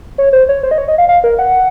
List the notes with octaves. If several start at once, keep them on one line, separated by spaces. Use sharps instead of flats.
C#5
C5
C#5
C5
D#5
C#5
D#5
F5
F5
A#4
F#5